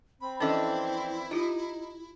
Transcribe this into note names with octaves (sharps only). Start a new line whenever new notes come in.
C4 B5
F2 E3 C#4 D4 E4 A4 D#5
D#4 F4 G4